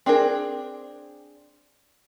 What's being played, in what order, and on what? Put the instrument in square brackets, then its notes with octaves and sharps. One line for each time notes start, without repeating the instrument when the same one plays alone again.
[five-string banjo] C4 D4 G#4 A#4